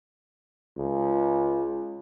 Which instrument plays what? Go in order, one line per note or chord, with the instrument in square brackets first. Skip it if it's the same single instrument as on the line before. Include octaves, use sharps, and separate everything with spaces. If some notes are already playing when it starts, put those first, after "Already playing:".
[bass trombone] C#2